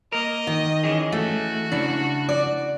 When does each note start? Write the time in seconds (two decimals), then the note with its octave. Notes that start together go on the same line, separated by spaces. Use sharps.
0.12 A#3 A#4 D#5
0.47 D#3
0.84 E3 C#4 G#4
1.12 A3 F#4
1.72 C#3 C#4 D4 E4
2.29 D5